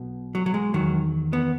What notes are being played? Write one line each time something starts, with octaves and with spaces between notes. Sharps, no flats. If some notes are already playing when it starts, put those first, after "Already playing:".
Already playing: B1 B2
F#3
F#3
G#3
E2 D#3 F#3
B3